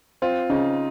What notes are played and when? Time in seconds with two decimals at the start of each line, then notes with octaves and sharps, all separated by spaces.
0.22 C4 F4
0.50 C#3 D#4